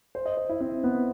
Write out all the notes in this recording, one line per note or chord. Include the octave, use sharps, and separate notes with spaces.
C5
D#5
C5
E4
C4
B3